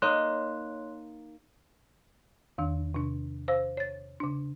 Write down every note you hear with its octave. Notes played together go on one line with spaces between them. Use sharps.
A#3 D#4 C#5 C6 F#6
E2 D#3 D4
C3 D4
C5 F5 E6
C#5 A6
C#3 D4